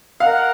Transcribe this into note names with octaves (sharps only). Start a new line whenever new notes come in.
A#4 D#5 F5 F#5